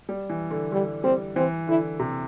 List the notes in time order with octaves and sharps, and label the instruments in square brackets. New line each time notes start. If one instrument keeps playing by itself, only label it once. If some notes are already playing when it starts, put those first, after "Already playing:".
[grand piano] G3
E3
D3
[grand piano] D3 [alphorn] G3
[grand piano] G3 [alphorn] C4
[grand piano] E3 [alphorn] C4
[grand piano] D3 [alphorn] E4
[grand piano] C3